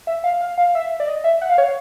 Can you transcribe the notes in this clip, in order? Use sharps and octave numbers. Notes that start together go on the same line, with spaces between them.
E5
F5
F5
F5
E5
D5
D#5
E5
F#5
F5
C#5